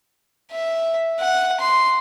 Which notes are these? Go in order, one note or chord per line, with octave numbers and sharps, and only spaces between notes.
E5
F#5
C6